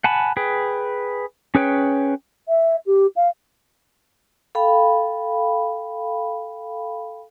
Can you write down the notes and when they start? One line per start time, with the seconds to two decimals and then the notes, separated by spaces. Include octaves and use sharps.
0.04 F#5 G#5 A5 B5
0.37 G#4 B4 G5
1.55 C#4 G#4 B4 C#5 G5
2.48 E5
2.86 G4
3.16 F5
4.55 A4 F5 G5 B5